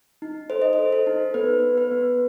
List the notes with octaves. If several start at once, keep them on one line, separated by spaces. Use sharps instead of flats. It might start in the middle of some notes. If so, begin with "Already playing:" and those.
D#4
A4 C5
D#5
A4 C5
A4
D#4
B3 B4
B3
B4
B3